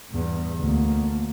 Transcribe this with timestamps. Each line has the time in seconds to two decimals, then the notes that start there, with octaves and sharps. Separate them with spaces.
0.10 E2 G2
0.59 D2 A#3